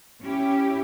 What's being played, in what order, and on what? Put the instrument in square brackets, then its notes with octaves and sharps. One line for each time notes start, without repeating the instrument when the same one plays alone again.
[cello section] C#4 E4 G4